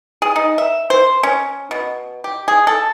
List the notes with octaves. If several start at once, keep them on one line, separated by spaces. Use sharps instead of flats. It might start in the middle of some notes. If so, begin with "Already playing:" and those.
G#4
D#4
E5
C5
C#4
B2
G4
G#4
A4